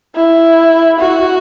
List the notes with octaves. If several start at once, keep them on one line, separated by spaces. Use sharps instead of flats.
E4
F#4